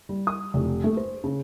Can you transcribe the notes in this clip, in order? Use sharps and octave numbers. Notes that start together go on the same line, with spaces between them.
G3
D#6
F1
A3
C5
C#3